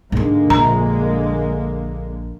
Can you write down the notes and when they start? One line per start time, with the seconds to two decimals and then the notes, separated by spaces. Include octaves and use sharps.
0.12 G#2 D3 G#3 A#3 D4
0.50 A#1 A#5